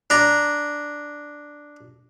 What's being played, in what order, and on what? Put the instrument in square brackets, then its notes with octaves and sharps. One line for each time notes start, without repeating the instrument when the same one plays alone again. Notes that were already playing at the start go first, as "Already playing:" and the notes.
[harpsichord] D4 A#5